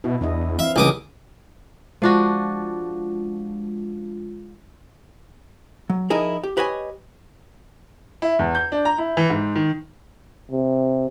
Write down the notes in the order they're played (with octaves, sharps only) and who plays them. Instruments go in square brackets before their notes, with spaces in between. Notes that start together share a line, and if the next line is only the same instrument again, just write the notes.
[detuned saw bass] B2 [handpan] E4
[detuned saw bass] E2 [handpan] D4 E4 D#5
[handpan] E3 C4 F5 [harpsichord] E5
[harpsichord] C#2 D6 D#6 [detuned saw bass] E3 [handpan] G3 G#3 A#3
[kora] F3 D4 F#4 [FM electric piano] G#3 F4
[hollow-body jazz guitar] F#3
F3 D#4 E4 G#4 A#4
G4
G4 B4 C#5 D#5 E5 G#5
[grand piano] E4
E2
G6
D4
A#5
E4
E3
G#2
D#3
[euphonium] C3